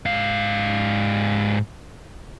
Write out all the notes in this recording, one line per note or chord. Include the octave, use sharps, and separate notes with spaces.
G#2 F5